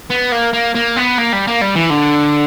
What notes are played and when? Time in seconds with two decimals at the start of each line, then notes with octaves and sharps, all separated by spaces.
0.11 B3
0.32 A#3
0.53 A#3
0.75 A#3
0.97 B3
1.18 A#3
1.33 G3
1.47 A#3
1.61 G3
1.76 E3
1.90 D3